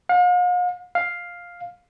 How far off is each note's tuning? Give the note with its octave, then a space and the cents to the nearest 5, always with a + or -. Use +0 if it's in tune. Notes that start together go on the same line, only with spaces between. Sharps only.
F5 +45
F5 +5